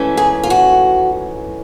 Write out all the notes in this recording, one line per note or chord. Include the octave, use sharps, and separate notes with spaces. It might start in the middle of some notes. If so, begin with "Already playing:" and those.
Already playing: G#2 E3 A3 C#4
G#4
F4
F#4